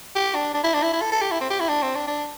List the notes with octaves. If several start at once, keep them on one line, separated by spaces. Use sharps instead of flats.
G4
D4
D4
E4
D4
E4
E4
A4
A4
G4
E4
C4
G4
E4
D4
C4
D4
D4